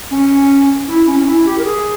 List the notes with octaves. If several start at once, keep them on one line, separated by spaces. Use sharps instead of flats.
C#4
E4
C#4
C#4
E4
G4
A#4
G#4